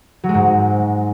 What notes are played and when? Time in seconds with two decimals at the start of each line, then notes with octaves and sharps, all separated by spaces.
0.24 F#3
0.29 G#3
0.34 G#2